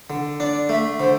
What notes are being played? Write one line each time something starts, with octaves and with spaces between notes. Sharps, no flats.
D3
D4 D5
A3 E5
D3 C5